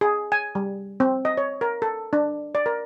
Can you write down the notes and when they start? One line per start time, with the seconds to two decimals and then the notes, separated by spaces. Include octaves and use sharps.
0.01 G#4
0.32 G#5
0.55 G3
1.00 C4
1.25 D#5
1.37 C#5
1.61 A#4
1.82 A4
2.13 D4
2.55 D5
2.66 A#4